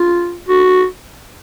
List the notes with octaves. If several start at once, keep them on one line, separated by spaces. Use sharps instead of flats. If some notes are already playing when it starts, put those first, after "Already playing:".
Already playing: F4
F#4